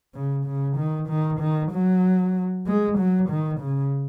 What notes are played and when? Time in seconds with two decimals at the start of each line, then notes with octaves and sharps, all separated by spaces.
0.14 C#3
0.46 C#3
0.77 D#3
1.09 D#3
1.40 D#3
1.72 F#3
2.67 G#3
2.98 F#3
3.30 D#3
3.60 C#3